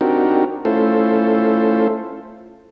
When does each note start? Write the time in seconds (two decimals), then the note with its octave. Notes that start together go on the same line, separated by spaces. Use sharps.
0.01 C4 D4 D#4 F#4 G4 A#4
0.65 A3 C#4 E4 F4 A4 C5